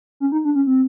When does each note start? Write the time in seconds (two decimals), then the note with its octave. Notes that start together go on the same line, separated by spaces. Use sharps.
0.20 C#4
0.32 D#4
0.45 D4
0.55 C#4
0.67 C4